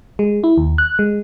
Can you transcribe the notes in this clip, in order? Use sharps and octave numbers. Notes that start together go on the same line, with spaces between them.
G#3
E4
D#2
F#6
G#3